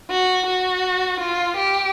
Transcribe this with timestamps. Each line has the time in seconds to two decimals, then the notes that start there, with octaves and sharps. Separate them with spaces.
0.10 F#4
0.47 F#4
1.20 F4
1.57 G4